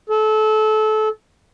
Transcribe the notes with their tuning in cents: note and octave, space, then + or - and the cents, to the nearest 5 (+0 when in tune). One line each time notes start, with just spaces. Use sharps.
A4 -25